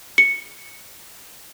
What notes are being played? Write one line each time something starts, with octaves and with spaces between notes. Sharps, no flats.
C#7